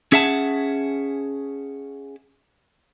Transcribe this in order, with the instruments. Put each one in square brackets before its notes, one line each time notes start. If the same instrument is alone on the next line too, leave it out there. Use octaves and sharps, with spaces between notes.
[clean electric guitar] C#4 G#4 E5 F#5 A5